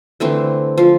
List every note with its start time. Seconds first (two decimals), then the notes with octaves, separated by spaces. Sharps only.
0.20 D3 E3 A3 C4
0.78 F3 F5